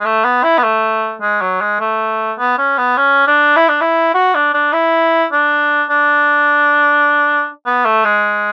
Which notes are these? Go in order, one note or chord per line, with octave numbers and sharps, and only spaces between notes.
G#3
A3
B3
E4
B3
A3
G#3
F#3
G#3
A3
B3
C#4
B3
C#4
D4
E4
D4
E4
F#4
D4
D4
E4
D4
D4
B3
A3
G#3